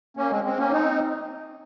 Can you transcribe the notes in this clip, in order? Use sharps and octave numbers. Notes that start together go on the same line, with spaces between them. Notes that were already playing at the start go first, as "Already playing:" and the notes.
A#3 C#4
G#3 C4
G#3 C4
A#3 C#4
C4 D#4